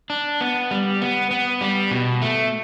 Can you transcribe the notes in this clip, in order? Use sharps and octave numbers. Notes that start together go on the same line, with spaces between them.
D4
B3
G3
B3
B3
G3
B2
A3